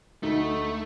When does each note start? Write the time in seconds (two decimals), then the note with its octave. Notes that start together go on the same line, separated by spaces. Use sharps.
0.23 D2 A3 D#4